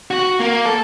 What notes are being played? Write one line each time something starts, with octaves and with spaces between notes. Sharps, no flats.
F#4
F#4
A#3
A4